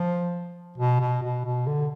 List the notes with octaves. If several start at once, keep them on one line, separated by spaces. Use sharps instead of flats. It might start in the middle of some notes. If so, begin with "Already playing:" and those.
Already playing: F3
B2
B2
B2
B2
D3